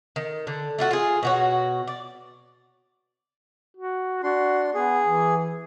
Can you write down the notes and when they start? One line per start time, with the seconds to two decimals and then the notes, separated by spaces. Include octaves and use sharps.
0.16 D#3
0.47 D3
0.79 A3 F4 F#4
0.91 F4 G#4
1.23 B2 F#4 C#5
1.87 D5
3.77 F#4
4.23 D4 F#4 C6
4.74 B3 G#4
5.05 E3